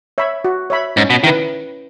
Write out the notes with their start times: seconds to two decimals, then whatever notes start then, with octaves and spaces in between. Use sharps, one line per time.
0.18 C#5 E5 B5
0.45 F#4
0.70 C#5 E5 B5
0.97 G#2 C#4
1.10 B2
1.23 D#3 E4
1.27 B4